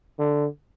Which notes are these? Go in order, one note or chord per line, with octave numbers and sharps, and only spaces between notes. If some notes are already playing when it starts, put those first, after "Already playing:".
D3